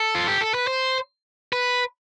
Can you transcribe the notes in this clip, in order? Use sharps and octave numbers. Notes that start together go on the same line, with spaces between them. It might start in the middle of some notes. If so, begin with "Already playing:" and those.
Already playing: A4
F4
G4
A4
B4
C5
B4